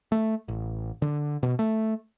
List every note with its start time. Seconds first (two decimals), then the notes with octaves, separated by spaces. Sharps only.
0.12 A3
0.48 A1
1.02 D3
1.43 B2
1.59 A3